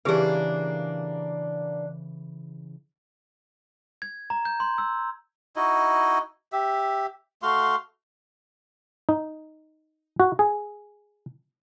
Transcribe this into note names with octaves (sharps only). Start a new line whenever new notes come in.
C#3 E3 A#3 D4 G4 G#4 B4
G#6
A#5
G6
C6
E6
D#4 E4 F#4 D#5
G4 E5
A3 F#4 F5 C6
D#4
F#4
G#4